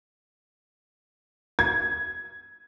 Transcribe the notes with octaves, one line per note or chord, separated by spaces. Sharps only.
G#6